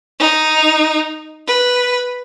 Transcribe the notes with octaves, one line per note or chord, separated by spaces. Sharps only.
D#4
B4